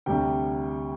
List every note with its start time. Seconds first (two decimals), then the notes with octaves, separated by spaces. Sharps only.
0.06 D2 C3 G3 G5